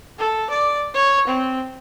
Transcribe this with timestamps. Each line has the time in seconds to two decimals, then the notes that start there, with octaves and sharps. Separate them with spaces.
0.19 A4
0.50 D5
0.94 C#5
1.27 C4